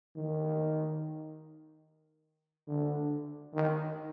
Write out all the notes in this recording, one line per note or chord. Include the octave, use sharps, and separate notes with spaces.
D#3
D3
D#3